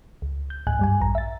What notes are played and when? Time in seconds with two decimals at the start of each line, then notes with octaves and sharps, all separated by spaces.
0.22 C#2
0.50 G6
0.67 C#2 G#2 G#5 F#6
0.79 G2 G3 G#5
1.00 A#1 E2 A#5
1.15 E5 A6